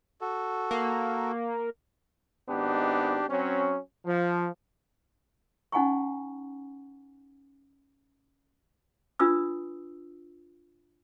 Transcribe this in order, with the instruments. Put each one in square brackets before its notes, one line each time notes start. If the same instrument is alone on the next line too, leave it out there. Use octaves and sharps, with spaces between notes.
[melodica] F#4 A4
[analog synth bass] A#3
[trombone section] G#1 B3 D4 D#4 G4
F#3 C4 C#4
F3
[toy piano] C#4 D#4 F#5 G#5 A#5 C#6
D4 F4 B4 D#6 E6